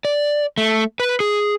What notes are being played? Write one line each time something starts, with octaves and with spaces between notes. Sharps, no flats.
D5
A3
B4
G#4